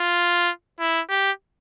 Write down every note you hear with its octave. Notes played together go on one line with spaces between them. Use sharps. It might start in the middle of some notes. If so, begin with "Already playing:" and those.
Already playing: F4
E4
G4